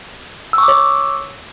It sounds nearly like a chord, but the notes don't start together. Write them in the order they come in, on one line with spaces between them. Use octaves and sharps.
E6 C#6 D6 C#5